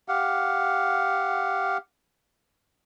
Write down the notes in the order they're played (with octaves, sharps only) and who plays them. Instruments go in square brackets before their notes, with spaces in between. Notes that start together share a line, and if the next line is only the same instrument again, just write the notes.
[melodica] G4 F5 F#5